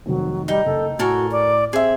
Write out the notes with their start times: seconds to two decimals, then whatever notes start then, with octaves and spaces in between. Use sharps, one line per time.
0.06 F1 D#3 F#3
0.48 G3 D#4 G5
0.66 F#1 A4
0.99 A2 F#4 A4 A#4 G#5
1.32 D5
1.73 C4 G#4 E5